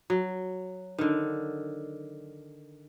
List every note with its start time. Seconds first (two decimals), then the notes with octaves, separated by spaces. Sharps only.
0.10 F#3
0.98 D3 D#3